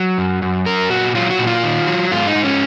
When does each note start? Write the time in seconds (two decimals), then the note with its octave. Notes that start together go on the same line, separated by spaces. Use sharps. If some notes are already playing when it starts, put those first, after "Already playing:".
Already playing: F#3
0.18 F#2
0.42 F#2
0.66 F#3 A#4
0.90 A#2 F#4
1.15 F#3 F4
1.30 F#4
1.39 A#2
1.47 F4
1.64 D#3
1.87 F#3
2.12 G#2 F4
2.27 D#4
2.35 G#2
2.44 C#4